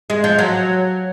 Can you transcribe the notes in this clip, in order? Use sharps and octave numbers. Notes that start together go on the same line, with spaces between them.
G#3
F3
F#3